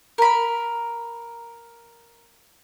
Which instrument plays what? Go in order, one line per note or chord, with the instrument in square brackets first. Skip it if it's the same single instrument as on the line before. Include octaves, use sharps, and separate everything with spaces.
[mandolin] A#4 B5